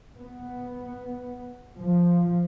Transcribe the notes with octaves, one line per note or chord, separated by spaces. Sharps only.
B3
F3